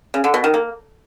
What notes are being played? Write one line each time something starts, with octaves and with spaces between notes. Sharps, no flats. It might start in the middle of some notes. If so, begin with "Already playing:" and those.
C#3
D3
B2
D#3
A#3